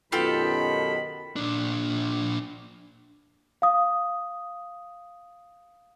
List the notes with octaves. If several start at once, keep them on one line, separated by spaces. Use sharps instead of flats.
F#2 B2 D#3 F4 G4 A4 B5
A#2 D4
F5 D#6